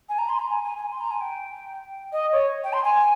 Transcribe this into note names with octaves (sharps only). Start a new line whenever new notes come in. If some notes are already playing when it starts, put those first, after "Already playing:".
G#5
A#5
C6
A#5
G#5
G#5
G#5
C6
A#5
G#5
G5
D#5
C#5
G5
C6
G#5